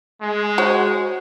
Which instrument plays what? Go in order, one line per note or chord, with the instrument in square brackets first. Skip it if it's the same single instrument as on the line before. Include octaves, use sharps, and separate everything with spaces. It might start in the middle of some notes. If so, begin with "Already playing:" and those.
[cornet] G#3
[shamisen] F#4 C5 C#5